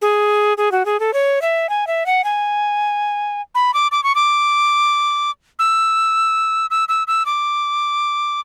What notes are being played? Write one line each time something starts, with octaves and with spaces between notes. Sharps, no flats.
G#4
G#4
F#4
G#4
A4
C#5
E5
G#5
E5
F#5
G#5
B5
D6
D6
C#6
D6
E6
E6
E6
E6
D6